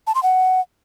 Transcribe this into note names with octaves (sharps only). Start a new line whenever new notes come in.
A5
C6
F#5